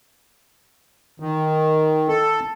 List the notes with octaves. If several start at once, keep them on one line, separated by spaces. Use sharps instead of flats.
D#3
A4